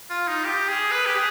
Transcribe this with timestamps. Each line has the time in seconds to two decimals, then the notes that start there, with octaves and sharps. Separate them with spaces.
0.10 F4
0.28 D#4
0.45 G4
0.68 G#4
0.91 B4
1.06 G4
1.15 G#4